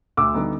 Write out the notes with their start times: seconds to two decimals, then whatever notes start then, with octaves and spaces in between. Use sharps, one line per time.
0.17 D2 D6 E6
0.34 D3 G3 B3 D#4